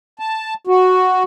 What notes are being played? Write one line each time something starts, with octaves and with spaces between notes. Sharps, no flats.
A5
F#4